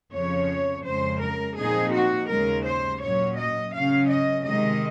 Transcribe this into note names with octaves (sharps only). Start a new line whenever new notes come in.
F2 C#3 F3 C#5
F2 C#3 G#3 C5
A#4
A#2 F3 C4 D#4 G#4
F#4
D#2 C#3 G#3 A#4
C5
A#2 F#3 C#4 C#5
D#5
C#3 F#3 C#4 F5
D#5
C3 D#3 G#3 D#5